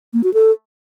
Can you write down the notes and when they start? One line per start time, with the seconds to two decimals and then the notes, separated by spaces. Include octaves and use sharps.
0.13 A#3
0.24 F#4
0.34 A4